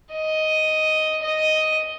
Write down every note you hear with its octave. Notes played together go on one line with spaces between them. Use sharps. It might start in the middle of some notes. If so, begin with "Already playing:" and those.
D#5
D#5